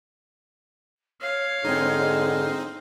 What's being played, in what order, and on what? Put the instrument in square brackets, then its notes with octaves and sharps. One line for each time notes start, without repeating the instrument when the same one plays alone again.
[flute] C#5 [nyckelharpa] F5
[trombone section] G#2 D3 G#3 [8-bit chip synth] C4 D#4